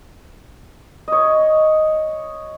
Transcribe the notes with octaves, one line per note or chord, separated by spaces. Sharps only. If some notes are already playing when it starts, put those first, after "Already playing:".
C#5 D#5